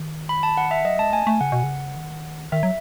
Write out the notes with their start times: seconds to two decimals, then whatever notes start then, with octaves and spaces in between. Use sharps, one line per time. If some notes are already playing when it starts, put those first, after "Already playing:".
Already playing: D#3
0.29 B5
0.43 A5
0.57 F#5
0.71 E5
0.85 F#3 D#5
0.99 G#3 A5
1.13 A3 G#5
1.27 A3 G#5
1.41 C#3 F#5
1.52 B2
1.64 C#3
1.96 D#3
2.52 D#3 E5
2.63 F#3